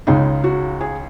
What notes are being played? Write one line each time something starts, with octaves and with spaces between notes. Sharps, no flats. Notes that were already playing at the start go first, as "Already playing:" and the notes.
C#2 C#3 G#3 D#4
F#4
G#4